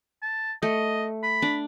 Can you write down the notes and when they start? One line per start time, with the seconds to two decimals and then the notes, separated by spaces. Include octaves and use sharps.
0.23 A5
0.63 A3 D#5
1.23 B5
1.42 D4